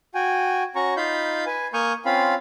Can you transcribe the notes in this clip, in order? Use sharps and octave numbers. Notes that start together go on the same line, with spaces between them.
F#4 G5 G#5
C#4 F#4 A#5 C#6
D#4 F4 F5 B5 G6
B4 G#5
A#3 G#5 C#6 D#6 F6 G6
C4 C#4 F4 F5 B5